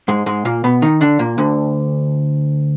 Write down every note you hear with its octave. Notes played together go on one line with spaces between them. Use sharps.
G#2 G#3
G#2 G#3
A#2 A#3
B2 B3
D#3 D#4
D3 D4
A#2 A#3
D2 D3